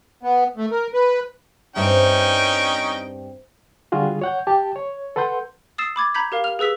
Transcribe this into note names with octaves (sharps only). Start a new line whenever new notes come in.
B3
A3
A#4
B4
E2 G2 C4 C#4 D#4 C5 E5 G5
D3 G3 F4 F#4 G#4
C#5 F#5 G6
G4 A5
C#5
A4 B4 F#5 C6 G6
D#6 E6 A6 C7 E7
B5 D6 G#6 A6
A#5 B5 G6 G#6 B6
G4 A#4 F5
F6 F7
G#4 B4 E6 B6